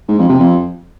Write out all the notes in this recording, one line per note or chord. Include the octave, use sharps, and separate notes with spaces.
G#2
F2
C3
F2